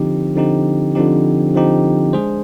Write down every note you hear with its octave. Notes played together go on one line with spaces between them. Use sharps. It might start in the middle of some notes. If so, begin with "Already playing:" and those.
Already playing: D3 F3 C4 D#4 G4
D3 F3 C4 D#4 G4
D3 F3 C4 D#4 G4
D3 F3 C4 D#4 G4
G#3 D4 G#4 C5